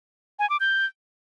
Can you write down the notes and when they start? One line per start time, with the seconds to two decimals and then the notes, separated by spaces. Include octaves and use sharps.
0.39 G#5
0.50 D6
0.60 G6